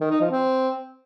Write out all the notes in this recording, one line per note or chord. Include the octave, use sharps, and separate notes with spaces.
D#3
D#4
F3
C4